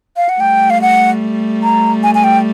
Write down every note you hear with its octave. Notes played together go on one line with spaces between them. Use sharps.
F5
F#5
G3 A3 G5
F5
F#5
A#5
G#5
G#5
G5